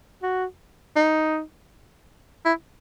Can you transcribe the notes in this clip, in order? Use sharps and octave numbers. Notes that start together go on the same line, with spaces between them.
F#4
D#4
E4